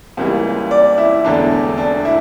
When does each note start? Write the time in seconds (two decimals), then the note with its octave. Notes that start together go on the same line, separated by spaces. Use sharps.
0.17 C#2 C#3 E3 G3 A#3
0.71 D5
0.98 E4
1.24 E1 E2 D3 A3 D4
1.78 D4
2.05 E4